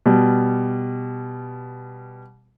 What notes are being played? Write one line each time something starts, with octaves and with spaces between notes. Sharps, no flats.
B2 G3